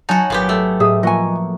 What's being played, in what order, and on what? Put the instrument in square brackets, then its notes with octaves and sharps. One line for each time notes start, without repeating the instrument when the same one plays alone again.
[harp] F#3 [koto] D#4 F#4 [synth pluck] C#5 G#5 A5
[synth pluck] G#1 [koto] A#2 B3 G4
[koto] A3
[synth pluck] A2 [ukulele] G#4 [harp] E5 D#6
[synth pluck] F3 A#3 [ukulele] D#5 G#5 [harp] A#5 C#6 F#6